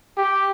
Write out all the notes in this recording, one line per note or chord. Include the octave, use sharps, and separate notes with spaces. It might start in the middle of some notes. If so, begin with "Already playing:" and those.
G4